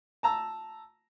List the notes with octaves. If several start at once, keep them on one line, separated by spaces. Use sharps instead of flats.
A5 A#5 E6